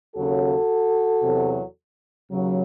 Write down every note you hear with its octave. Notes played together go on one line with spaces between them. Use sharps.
D#2 C#3 F#3 F#4 A4
E2 C3 F#3
D#2 C#3 F#3